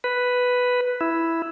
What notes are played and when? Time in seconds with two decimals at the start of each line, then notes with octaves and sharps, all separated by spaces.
0.04 B4
1.01 E4